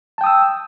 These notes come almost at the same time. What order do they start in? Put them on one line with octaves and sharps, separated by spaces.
A5 G5 D#6 E6